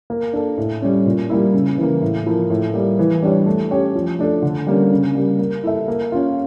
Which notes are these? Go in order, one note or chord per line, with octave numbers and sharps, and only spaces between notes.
A#3
D4 A4
A2
G3 C#4
A#2
G3 A#3 E4
C#3
E3 A#3
A2
F3 A#3 E4
A2
G3 A#3
E3
G3 D4 G4 C#5
A3
C#4 G4 C#5
F3
A3 D4 A4
D3
G3 A#3 C#4
C#3
G3 A#3
A#3
E4 A4 E5
A#3
C#4 F4